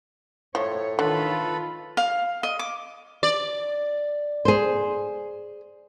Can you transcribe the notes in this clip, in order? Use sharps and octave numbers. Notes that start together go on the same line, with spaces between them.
A2 F3 C#5
D3 D#3 F4 A4 B4 B5
F5
D#5
D6
D5
G#4 C5